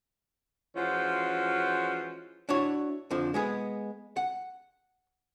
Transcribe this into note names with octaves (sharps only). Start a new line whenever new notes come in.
E3 F3 G#3 C#4 F4 F#4
D4 E4 F#4 C#5
F2 D3 F3
G#3 B3 G#4
F#5